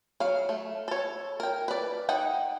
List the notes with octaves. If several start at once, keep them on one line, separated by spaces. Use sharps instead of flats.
F#3 F5
A3
A4 C#5
A#4 G5
B4 D5
D#4 F#5 G5